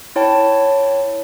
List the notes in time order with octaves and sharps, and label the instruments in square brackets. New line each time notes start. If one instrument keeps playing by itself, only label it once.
[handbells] E4 C#5 G5 A5